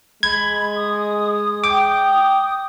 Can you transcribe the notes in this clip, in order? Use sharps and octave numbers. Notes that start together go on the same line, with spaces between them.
G#3 B5 G#6
D#6
G5 D6 D#6